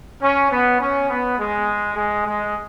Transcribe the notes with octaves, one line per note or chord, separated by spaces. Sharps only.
C#4
B3
C#4
B3
G#3
G#3
G#3